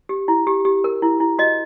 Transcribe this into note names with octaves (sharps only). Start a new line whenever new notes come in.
G4
E4
G4
G4
A#4
E4
E4
F#4 D#5